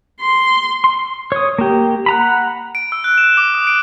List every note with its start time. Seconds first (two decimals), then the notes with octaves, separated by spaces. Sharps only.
0.20 C6
0.84 C6
1.32 C#5 D#6
1.59 A#3 G4
2.06 F#5 A#5 B5
2.75 D7
2.92 E6
3.04 F#6
3.18 E7
3.37 D6
3.54 D#6
3.67 D7